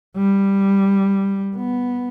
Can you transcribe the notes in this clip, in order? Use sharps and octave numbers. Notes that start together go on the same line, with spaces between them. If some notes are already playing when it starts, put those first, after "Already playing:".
G3
B3